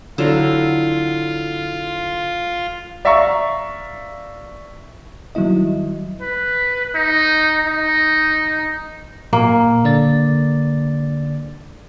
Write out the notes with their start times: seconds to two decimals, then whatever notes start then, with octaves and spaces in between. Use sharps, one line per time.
0.18 D3 F#3 E4 F4
3.05 D5 E5 F5 A#5 C#6
5.35 D#3 F#3 G3 E4 D#5
6.21 B4
6.95 D#4
7.67 D#4
9.33 A#2 A#3
9.84 D3 D5 A6